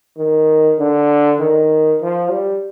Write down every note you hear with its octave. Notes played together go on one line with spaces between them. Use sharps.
D#3
D3
D#3
F3
G3